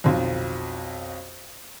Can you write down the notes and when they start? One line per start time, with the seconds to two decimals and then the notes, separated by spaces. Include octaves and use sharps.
0.04 B1 F2